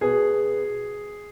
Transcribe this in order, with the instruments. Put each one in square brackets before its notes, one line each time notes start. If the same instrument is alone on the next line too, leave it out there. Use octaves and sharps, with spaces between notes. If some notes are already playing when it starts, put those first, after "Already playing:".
[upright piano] B2 B3 G#4